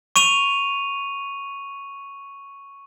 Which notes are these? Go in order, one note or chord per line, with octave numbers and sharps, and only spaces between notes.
C#6 D#7 F7